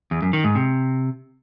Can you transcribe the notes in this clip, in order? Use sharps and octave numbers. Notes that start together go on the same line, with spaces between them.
E2
F#2
D#3
G#2
C3